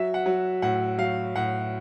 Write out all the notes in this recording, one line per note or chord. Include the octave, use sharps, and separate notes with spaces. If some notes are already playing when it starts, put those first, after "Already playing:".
Already playing: F#3 E5
F#5
F#3
A2 F#5
F#3 F5
A2 F#5